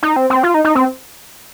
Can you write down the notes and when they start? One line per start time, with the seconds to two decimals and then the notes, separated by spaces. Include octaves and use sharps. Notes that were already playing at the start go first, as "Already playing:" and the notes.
0.03 D#4
0.16 C4
0.30 C4
0.43 F4
0.54 D#4
0.65 D#4
0.75 C4